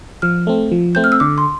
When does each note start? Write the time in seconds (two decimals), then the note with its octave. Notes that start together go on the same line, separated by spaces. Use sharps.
0.22 F3 F6
0.47 A3 C4
0.71 F3
0.95 A3 C4 G6
1.04 F6
1.12 E6
1.20 D3 D6
1.38 C6